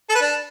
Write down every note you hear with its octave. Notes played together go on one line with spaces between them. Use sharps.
A4
B4
D4